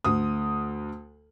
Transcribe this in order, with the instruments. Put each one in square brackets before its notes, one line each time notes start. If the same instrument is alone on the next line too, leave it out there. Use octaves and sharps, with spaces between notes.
[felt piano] D2 D#6